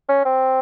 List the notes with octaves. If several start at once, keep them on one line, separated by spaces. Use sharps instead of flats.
C#4
C4